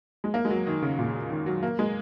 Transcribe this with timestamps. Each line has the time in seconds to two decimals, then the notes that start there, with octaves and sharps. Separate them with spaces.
0.24 G#3
0.34 A#3
0.45 G#3
0.50 F#3
0.67 D#3
0.82 C#3
0.99 A#2
1.30 D#3
1.46 F#3
1.63 A#3
1.79 G#3